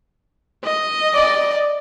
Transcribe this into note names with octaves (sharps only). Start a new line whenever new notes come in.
D#5
D5